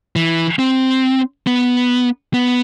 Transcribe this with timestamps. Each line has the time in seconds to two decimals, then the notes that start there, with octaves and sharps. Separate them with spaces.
0.16 E3
0.59 C4
1.47 B3
2.34 B3